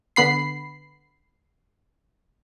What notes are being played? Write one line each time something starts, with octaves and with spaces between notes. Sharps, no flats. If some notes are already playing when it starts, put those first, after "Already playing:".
D3 B3 B5 C7